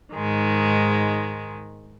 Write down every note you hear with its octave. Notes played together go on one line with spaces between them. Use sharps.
G#2 D#3 G#3